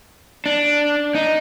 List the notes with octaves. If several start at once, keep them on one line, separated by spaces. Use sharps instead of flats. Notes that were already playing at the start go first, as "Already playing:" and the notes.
D4
D#4